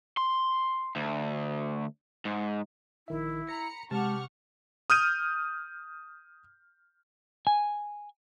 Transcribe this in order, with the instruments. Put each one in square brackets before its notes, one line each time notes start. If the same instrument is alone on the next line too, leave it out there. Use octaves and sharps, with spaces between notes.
[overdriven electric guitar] C6
D2
G#2
[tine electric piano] A#1 D#3 E5 [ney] E4
[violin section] A#5 B5 C#7 [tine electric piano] A#6
[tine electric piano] C3 [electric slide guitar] G#3 A5 [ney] G4 [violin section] F#5 C#6 F6
[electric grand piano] D#6 F6 G6 D#7
[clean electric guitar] G#5